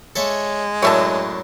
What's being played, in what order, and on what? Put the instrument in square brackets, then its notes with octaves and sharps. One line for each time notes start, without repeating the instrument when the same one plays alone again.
[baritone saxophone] G#3 [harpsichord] A4 C#5 E5
[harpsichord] F#2 A2 D4 [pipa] C#5 E5 A5